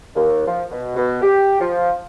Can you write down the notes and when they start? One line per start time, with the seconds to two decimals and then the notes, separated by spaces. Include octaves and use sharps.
0.16 D#2
0.47 F3
0.71 B2
0.96 B2
1.22 G4
1.60 F3